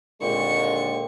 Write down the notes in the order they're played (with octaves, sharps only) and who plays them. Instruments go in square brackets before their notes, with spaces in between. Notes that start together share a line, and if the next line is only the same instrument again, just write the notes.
[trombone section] D#2 D3 G#3 [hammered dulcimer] A#2 C4 [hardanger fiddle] C#6